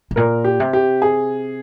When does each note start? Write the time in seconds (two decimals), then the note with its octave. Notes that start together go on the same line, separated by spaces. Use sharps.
0.11 G#2
0.16 A#2 A#4
0.44 G4
0.60 C3
0.73 G4
1.02 G#4